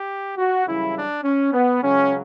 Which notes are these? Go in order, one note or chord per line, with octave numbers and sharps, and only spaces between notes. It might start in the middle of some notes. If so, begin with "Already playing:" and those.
Already playing: G4
F#4
F#2 C#3 E3 G3 E4
D4
C#4
B3
C#2 C#3 F#3 C#4